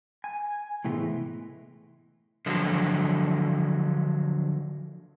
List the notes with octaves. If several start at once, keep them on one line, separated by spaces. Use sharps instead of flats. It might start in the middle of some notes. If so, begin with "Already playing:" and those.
G#5
A2 C3 E3 G#3 A3 B3
D3 F3 F#3